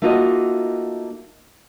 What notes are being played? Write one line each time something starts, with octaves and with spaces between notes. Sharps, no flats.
A3 A#3 D#4 F4 F#4 D#5